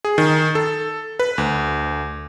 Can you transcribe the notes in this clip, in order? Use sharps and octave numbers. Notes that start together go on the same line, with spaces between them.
G#4
D#3
A4
B4
D2